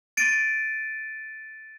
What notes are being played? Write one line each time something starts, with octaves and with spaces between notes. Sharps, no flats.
A6 D7 D#7